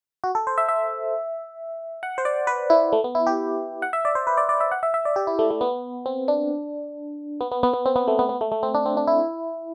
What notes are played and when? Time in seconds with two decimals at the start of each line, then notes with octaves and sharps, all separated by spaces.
0.24 F#4
0.35 A4
0.47 C5
0.58 E5
0.69 E5
2.03 F#5
2.18 C5
2.25 D5
2.47 B4
2.70 E4
2.93 A3
3.04 B3
3.15 E4
3.27 G4
3.82 F#5
3.93 E5
4.05 D5
4.15 C5
4.27 B4
4.37 D5
4.49 D5
4.61 E5
4.72 F#5
4.83 E5
4.94 E5
5.05 D5
5.16 G4
5.27 E4
5.39 A3
5.50 A3
5.61 B3
6.06 C4
6.28 D4
7.41 B3
7.52 B3
7.63 B3
7.73 B3
7.86 C4
7.96 B3
8.08 A3
8.19 B3
8.29 B3
8.41 A3
8.52 A3
8.63 C4
8.74 D4
8.86 C4
8.97 D4
9.07 E4